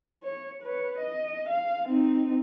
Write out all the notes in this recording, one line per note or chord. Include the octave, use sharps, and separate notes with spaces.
C#5
B4 C#5
D#5
F5
C4 D#4